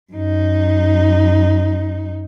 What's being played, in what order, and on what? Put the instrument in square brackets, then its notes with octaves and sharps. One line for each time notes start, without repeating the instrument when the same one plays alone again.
[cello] F#2 D#4